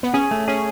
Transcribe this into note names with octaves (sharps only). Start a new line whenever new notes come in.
B3
C#4 G#4
A3
C#4 G#4